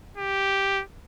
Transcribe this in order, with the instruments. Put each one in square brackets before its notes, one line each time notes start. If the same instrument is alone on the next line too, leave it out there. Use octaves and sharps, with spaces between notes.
[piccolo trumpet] G4